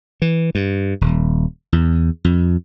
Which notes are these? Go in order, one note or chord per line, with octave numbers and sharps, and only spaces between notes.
E3
G2
D#1
E2
F2